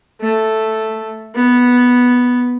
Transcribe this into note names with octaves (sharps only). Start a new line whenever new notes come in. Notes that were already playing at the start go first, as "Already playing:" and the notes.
A3
B3